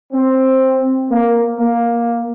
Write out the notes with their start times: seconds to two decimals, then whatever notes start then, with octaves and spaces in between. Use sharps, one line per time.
0.13 C4
1.10 A#3
1.58 A#3